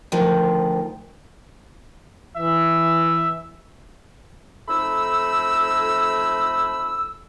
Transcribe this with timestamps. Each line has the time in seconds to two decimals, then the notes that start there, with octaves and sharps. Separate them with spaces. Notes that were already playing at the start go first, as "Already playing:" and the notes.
0.12 D2 D#3 F3
2.36 E3 E5
4.68 F2 A3 D#4 B5 E6